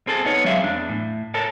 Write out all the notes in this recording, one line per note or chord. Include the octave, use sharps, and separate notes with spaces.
C4 G#4 A4
B3 D#4 C#5
F#3 G#3 C4 G#4 E5 F5
E2 D4
A2
A4 A#4 C#5 A5